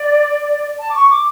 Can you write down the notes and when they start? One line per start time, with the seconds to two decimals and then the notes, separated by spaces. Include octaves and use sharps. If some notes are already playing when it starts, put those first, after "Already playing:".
Already playing: D5
0.79 A5
0.90 D6
0.94 C#6
1.09 D6